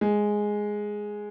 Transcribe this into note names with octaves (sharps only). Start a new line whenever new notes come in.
G#3